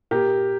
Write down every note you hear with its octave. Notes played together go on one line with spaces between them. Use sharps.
A#2 G4 A#4